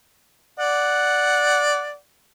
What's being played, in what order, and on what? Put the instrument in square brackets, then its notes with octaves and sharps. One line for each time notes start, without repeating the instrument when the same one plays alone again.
[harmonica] D5 F#5